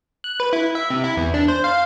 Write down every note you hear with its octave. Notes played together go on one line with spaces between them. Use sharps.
F#6
B4
E4
E5
C3
E4
E2
D4
C5
F5